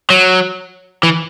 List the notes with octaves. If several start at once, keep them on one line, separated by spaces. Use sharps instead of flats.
F#3
E3